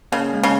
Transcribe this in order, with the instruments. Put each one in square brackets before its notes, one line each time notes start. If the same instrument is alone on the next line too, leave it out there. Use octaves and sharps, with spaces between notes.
[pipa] C#3 [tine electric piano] A#3
[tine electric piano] G#3
[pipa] C#3